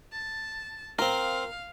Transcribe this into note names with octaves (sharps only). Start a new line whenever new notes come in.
A5
C4 F4 A#4 F5